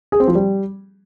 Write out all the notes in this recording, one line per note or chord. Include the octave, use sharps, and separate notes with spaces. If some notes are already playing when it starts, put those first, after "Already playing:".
G#4
C4
F3
G3